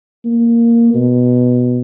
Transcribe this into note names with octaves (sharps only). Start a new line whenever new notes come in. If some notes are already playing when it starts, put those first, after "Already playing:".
A#3
B2